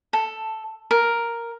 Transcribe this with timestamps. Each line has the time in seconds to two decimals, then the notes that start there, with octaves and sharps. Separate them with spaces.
0.13 A4
0.91 A#4